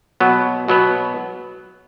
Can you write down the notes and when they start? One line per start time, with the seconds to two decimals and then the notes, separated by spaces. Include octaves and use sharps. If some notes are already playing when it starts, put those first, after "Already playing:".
0.20 B2 F#3 B3
0.68 B2 F#3 B3